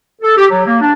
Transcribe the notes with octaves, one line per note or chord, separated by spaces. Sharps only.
A4
G4
F#3
A#3
D4